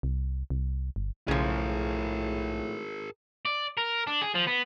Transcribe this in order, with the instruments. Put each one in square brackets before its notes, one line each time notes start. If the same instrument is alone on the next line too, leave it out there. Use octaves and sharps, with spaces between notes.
[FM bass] C2
C2
G1
[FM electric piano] B1 [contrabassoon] A2 [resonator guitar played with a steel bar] C#3 F3 [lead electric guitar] G#4 A#4
[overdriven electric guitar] D5
A#4
D4
G#4
F3
B3